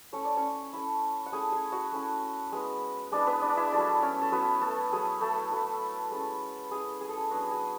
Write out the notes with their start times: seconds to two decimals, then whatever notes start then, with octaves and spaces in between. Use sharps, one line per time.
0.12 A3 C#4 E4 C#5
0.25 D5
0.37 C#4 C#5
0.73 A3 C#4 E4
1.26 F#5
1.32 A3 C#4 E4 G#4 G#5
1.52 G#4 G#5
1.72 F#4 F#5
1.92 A3 C#4 E4
2.52 G#3 B3 E4
3.12 G#3 B3 D4 E4 D5
3.27 B3 B4
3.41 D4 D5
3.57 E4 E5
3.72 F#3 A3 D4 E4 D5
4.02 C#4 C#5
4.22 A4
4.31 F#3 A3 B3 E4 B4
4.61 A3 A4
4.92 F#3 A3 E4 G#4
5.21 A3 A4
5.51 F#3 A3 E4
6.11 G#3 C#4 E4
6.71 G#3 C#4 E4 G#4
7.01 G#4
7.09 A4
7.17 G#4
7.31 F#3 B3 D4 F#4
7.51 G#4